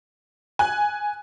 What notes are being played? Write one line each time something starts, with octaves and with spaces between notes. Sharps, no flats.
G#5 F#6